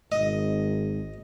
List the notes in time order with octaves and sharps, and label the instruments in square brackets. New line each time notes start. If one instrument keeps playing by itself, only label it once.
[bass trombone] G#1 [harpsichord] D#5